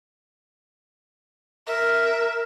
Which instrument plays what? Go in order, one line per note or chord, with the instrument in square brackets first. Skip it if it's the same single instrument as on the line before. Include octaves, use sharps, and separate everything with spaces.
[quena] A#4 [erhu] E5